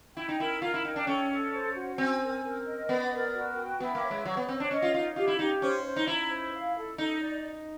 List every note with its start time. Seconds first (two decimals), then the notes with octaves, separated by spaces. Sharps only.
0.17 E4 G5
0.29 D#4
0.40 E4 A#4
0.62 F4 A#4
0.74 E4
0.85 D#4 G5
0.96 D4
1.07 C#4 A4
1.31 A4
1.53 C5
1.76 F#4
1.98 C4 G#5
2.22 A#4
2.43 A#4
2.67 D#5
2.89 B3 D5
3.12 A#4
3.34 F#4
3.57 G5
3.80 B3 E4
3.95 A#3
4.03 C#5
4.11 G#3
4.26 F#3 C#5
4.37 B3
4.48 C4 C#5
4.60 D4
4.71 C#4 D#5
4.82 F4
4.94 D#4 F4
5.16 F4 G4
5.28 E4
5.39 D#4 G4
5.61 C#4 C5
5.84 C5
5.96 D#4
6.07 E4 A#5
6.30 C5
6.53 F5
6.76 A4
6.98 D#4 A4
7.21 D5